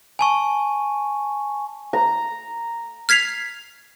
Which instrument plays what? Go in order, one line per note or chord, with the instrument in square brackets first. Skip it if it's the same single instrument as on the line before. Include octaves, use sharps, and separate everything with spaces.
[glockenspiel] G#5 A5 C#6
[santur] A#5
[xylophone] F6 G#6 B6 C7 F7